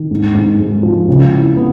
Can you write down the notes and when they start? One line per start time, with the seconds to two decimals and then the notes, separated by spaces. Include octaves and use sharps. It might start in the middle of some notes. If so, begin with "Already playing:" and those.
Already playing: D#3
0.11 G#2
0.35 G#2
0.60 G#3
0.83 F3
1.08 C#3
1.32 E4
1.56 B3